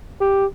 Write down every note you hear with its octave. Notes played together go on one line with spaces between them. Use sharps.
G4